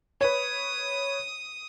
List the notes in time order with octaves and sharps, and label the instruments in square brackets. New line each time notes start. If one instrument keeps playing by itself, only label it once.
[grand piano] B4 C#5 [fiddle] D#6